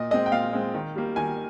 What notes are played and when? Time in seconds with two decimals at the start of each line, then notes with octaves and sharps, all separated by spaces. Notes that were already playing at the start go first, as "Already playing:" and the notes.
Already playing: A#2 D#5
0.11 G#3 C4 D#5
0.26 G5
0.32 A#2 F5
0.53 G#3 C4
0.74 D#3
0.96 G3 A#3
1.16 D#3 G#5